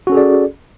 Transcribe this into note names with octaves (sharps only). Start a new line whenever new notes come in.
C#4 F#4 G#4 A4 D5